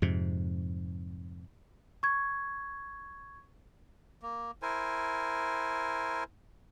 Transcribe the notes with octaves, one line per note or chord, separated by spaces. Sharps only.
F2 G#2 C3
C#6 G#6
A#3
E4 A#4 C5 G#5